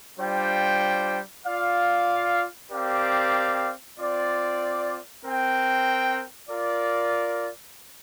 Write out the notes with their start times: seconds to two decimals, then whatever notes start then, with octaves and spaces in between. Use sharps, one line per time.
0.19 G3 D4 F4 C5 G5
1.45 F4 D5 F5
2.71 C4 G4 A#4 D5 F5
3.97 C4 F4 D5
5.23 C4 A#4 G5
6.50 F4 A#4 D5